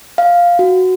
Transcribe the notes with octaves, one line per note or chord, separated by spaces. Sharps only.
F5
F#4